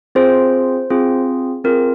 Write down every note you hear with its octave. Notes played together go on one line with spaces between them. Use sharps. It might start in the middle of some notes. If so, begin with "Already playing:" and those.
C4 F4 G#4 C5
C4 F4 G#4
C4 F4 G#4 A#4